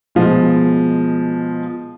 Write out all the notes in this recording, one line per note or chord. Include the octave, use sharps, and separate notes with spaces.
B2 F3 G#3 F4